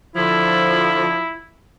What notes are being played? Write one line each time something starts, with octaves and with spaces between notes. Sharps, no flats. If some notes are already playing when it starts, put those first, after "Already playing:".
D3 F3 E4